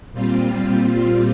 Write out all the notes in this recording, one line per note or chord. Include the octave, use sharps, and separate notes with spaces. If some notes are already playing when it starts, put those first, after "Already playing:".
A#2 G3 C4 F4